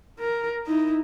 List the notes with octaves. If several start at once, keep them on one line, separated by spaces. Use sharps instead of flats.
A#4
D#4 E4